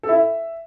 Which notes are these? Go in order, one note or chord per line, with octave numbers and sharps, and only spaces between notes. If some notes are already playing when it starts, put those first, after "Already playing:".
A4
E4
E5